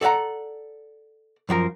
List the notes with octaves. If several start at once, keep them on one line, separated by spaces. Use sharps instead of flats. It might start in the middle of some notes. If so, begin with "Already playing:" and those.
A4 D5 E5 F#5 A#5
F#2 F3 F#4 A#4